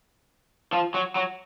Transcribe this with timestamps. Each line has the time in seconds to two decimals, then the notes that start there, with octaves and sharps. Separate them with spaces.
0.73 F3
0.94 F#3
1.15 F#3